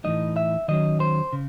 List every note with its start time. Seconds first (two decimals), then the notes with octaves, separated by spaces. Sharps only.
0.04 A2 E3 G#3 D#4 D#5
0.36 E5
0.68 D#3 F#3 C#4 D#5
1.00 C5
1.33 C#3